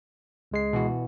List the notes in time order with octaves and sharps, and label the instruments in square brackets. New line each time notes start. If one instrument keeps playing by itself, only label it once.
[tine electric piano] C#2 G#3 C7
[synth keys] B2 E3 F#4